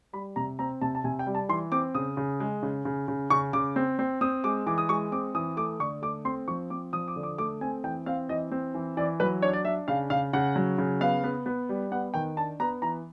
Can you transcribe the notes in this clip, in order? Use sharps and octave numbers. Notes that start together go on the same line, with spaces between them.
G3 B5
C3 A#5
C4 A#5
C3 A5
A5
C3 G#5
G5
G3
A5
E3 C6
C4 D6
C#3 D#6
C#3
G#3
C#3
C#3
C#3
C#3 C#6
C#3 D6
C4
C4
C4 D#6
G#3 D6
E3 D6
D#6
G#3 C#6
C4 D6
E3 D#6
A3 D6
D3 C#6
A3 D6
C4 C6
F3 C#6
C4 D6
F3 D#6
D6
D3
D6
A3 D6
C4 G#5
E3 G5
C4 F5
E3 D#5
C4
E3
E3 D5
F#3 B4
D4 C#5
D5
D4 E5
C#3 F5
C#3 F5
C#3 F#5
F#3
C#3
B3 F5
B3
B3
G3
B3 F#5
D#3 G5
D4 A5
B3 A#5
E3 A#5